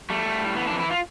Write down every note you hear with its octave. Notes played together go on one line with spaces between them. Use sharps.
G3 A3
G3
A2
E3 B3
D4
F2
E4
F4